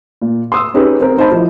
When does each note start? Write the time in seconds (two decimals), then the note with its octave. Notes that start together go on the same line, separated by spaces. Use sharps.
0.22 A#2
0.52 C6 D#6 E6
0.74 C#4 D#4 G4 G#4 B4
1.00 C4 A#4
1.18 D#4 C5 D#5 A5 B5
1.31 F3 E4